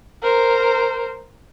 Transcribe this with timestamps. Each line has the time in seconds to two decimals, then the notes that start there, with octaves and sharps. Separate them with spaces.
0.23 A#4 C5